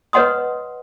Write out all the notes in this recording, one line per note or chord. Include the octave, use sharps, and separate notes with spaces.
B4 C#5 D#5 F#5 C6 D#6